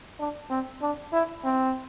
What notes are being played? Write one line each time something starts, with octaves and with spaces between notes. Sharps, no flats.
D4
C4
D4
E4
C4